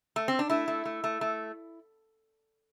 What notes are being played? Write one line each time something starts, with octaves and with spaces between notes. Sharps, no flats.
A3
C4
D4
A3 E4
A3
A3
A3
A3